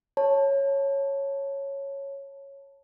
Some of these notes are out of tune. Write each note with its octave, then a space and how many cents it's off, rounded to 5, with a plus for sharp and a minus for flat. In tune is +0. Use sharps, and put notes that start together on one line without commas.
C#5 -5 A5 +0